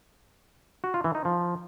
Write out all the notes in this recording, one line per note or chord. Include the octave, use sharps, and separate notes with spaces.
F#4
F4
E3
D#4
F3